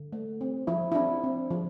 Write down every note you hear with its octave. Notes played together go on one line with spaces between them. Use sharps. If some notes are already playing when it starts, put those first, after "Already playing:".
Already playing: D3
A3
C4
F3 E4
E4
C4 D4
C4
F3